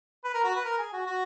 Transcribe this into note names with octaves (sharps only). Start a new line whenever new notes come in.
B4
A#4
F#4
B4
A#4
G#4
F#4
F#4